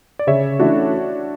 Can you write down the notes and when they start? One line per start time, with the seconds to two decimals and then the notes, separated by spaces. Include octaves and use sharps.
0.19 D5
0.27 C#3 C#5 E5
0.59 E3 A3 C#4 D4 E4 F#4